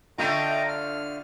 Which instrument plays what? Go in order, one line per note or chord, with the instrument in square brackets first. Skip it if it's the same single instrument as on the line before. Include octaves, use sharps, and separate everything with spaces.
[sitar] D3 A3 F4 [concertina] D#5 G5 A#5
[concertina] F6